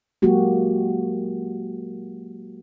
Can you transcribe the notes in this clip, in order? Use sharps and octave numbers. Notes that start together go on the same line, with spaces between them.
F#3 G#3 A#3 F#4 G4